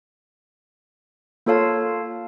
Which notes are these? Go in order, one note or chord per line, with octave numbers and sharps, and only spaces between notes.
A#3 F4 A4 C#5 F5 A5